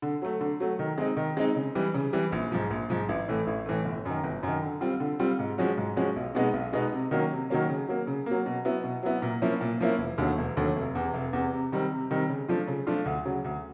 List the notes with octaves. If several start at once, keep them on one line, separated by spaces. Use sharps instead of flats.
D3
F#3 A3
D3
F#3 A3
D#3
G#3 C4 D#4
D#3
G#3 C4 D#4
C#3
E3 G3
C#3
E3 G3
A#1
G#2 F3
A#1
G#2 F3
A1
A2 E3 A3
A1
A2 E3 A3
G1
F#2 D#3
G1
F#2 D#3
D3
G3 C4 F4
D3
G3 C4 F4
G#2
F3 G#3 C#4 F#4
G#2
F3 G#3 C#4 F#4
B1
B2 G#3 B3 D#4
B1
B2 G#3 B3 D#4
C3
D#3 F#3 A#3 C#4
C3
D#3 F#3 A#3 C#4
C#3
F#3 A#3
C#3
F#3 A#3
B2
F#3 B3 E4
B2
F#3 B3 E4
A#2
F3 A#3 C#4 E4
A#2
F3 A#3 C#4 E4
E1
D#2 D3 F#3 A3
E1
D#2 D3 F#3 A3
F1
E2 C3
F1
E2 C3
C3
D#3 G3 C4
C3
D#3 G3 C4
C#3
F3 A3 D4 F4
C#3
F3 A3 D4 F4
D2
C#3 F#3
D2